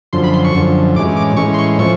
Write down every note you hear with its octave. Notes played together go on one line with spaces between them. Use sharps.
F#2 D3 F3 C6
B5
C6
C#6
F#2 D3 F3
A2 E3 G#3 C#4 D6
D6
A2 E3 G#3 C#4 C#6
C6
C#6
F3 A3 C#6